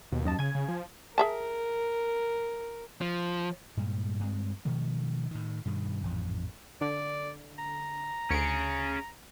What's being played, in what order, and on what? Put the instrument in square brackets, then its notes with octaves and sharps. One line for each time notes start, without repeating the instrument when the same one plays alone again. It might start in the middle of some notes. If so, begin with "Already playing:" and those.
[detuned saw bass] D#2 [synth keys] B2
[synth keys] F#2 D#5 A5
[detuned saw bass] C#3 [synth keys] G#5 G#6
[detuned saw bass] C#3
F3
[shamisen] G#4 E5 A5 [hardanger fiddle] A#4
[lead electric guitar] F3
[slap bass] G2 A#2 G3 G#3
G2 G#3 C4
B2 D#3 F3 A3
A2 D#3
G2 B2 D#3
A1 F2 G#2
[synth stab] D3 [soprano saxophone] D5
[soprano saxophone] A#5
[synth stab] D2 C#7 D7 [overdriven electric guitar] C#4 G#4